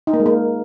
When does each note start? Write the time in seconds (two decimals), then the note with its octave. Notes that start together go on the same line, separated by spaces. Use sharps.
0.07 D#4
0.13 A#3
0.20 G#3
0.26 A#3